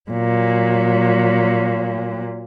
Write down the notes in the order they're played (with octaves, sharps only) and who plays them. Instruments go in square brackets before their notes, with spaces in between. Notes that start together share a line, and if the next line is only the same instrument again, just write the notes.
[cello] A#2 F#3